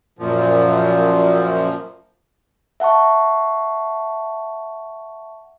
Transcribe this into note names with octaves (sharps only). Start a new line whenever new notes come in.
F#2 A#2 F3
E5 F#5 A5 C#6